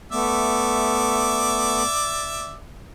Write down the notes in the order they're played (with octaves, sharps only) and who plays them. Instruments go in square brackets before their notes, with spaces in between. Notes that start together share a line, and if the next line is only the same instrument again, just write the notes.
[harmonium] A3 B3 [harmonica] D5 E5